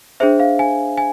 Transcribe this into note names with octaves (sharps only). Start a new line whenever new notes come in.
D4 G#4 C5 E5
F5
G#5
G#5